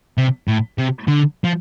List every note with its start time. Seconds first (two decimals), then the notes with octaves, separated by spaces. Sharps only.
0.18 C3
0.48 A2
0.78 C3
1.08 D3
1.44 F3